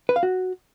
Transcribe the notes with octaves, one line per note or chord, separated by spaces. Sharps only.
B4
F5
F#4